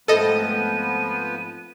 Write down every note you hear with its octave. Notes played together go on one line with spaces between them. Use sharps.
G#2 F3 A3 B3 C4 A4 D#5 D#7